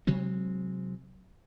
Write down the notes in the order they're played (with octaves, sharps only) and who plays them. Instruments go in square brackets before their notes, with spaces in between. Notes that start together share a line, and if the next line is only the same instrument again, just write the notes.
[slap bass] C3 F#3 G#3 C4